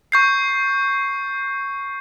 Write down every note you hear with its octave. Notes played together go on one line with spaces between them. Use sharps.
C#6 G6 C7